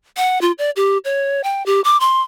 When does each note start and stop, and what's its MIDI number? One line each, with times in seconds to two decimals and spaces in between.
0.17 0.41 78
0.41 0.52 65
0.58 0.70 74
0.76 0.98 67
1.05 1.42 73
1.44 1.65 79
1.66 1.81 67
1.84 1.99 86
2.00 2.21 84